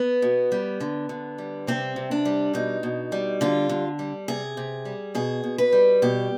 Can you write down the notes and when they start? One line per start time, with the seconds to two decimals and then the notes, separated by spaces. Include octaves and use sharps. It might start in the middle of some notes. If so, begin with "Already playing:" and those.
Already playing: B3
0.22 B2
0.52 G3
0.80 D3
1.09 D3
1.38 G3
1.67 C3 C4
1.96 C3
2.11 D4
2.25 G3
2.54 B2 D#4
2.83 B2
3.12 G3
3.41 D3 F4
3.69 D3
3.99 G3
4.28 C3 G#4
4.57 C3
4.85 G3
5.15 B2 G#4
5.43 B2
5.58 B4
5.72 G3
6.02 B2 G4